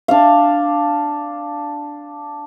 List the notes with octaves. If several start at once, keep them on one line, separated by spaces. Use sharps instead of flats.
D4 F5